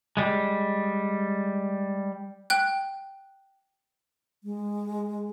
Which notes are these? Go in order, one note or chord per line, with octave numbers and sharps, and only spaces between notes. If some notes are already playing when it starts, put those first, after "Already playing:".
G3 G#3
G5 F#6
G#3